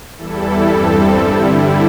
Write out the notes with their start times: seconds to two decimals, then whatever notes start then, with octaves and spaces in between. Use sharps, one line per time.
0.17 E2 E3 G3 E4 A4
0.69 G2 G3 C4 A4
1.20 D3 G3 E4